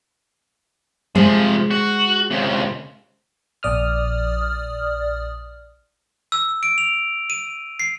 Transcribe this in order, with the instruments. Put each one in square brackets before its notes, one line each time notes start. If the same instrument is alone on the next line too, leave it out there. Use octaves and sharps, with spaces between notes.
[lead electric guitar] C3 F3 [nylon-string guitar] G#3 G#4 C5
[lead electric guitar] F#4
C#2 C3
[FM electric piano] A#1 D5 D#6 F6
[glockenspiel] E6
D7
F7
D#7
C7